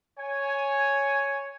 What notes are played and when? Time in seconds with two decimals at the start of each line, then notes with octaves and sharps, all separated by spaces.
0.19 C#5 G#5